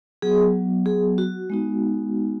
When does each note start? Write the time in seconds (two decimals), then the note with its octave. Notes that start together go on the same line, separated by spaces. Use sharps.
0.22 F#3 B3 F#4 G#4
0.86 G#4
1.18 F#4
1.50 G#3 B3 D#4 F#4